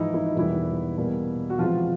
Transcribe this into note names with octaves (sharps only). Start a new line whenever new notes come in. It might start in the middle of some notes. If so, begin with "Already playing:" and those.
Already playing: G#2 E3 F3 G#3 D#4 E4
E4
D#4
E2 B2 E3 G3 A#3 E4
B2 G3 A#3
F#4
C3 E3 F3 G#3 F4